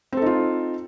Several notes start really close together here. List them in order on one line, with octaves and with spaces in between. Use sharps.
C4 A4 D#4 F4